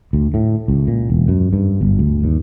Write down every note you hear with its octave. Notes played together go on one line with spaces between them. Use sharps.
D2
A2
C#2
A#2
E1
F#2
G2
G1
D2
D#2